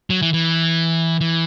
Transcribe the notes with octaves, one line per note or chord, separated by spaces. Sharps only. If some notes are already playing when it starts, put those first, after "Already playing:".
F#3
E3
E3
E3